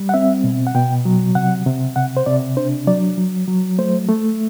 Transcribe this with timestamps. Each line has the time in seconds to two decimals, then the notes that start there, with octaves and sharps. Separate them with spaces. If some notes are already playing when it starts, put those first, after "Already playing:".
Already playing: G3
0.09 F#5
0.14 C4 E5
0.44 B2
0.67 F#5
0.75 B2 G5
1.05 F#3
1.35 C3 F#5
1.66 C3
1.96 C3 F#5
2.17 C5
2.26 C3 D5
2.57 D4 C5
2.87 F#3 D5
3.18 F#3
3.48 F#3
3.79 A3 C5
4.08 A3